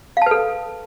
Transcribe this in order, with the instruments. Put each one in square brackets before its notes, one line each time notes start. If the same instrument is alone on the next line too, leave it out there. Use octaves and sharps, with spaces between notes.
[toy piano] F5
A5
B4
A4